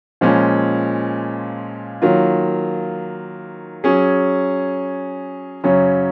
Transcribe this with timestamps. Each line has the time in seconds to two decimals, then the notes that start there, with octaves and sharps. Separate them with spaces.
0.21 A#2 F3 G#3 C#4
2.02 D#3 F#3 A#3 F4
3.84 F#3 C#4 G#4
5.64 F#2 C#3 F#3 C#4